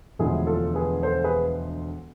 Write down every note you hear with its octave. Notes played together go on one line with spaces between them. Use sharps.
E1 D2 D3 F3 G#3 E4 G#4
F4 A4
G#4 B4
A4 C5
G#4 B4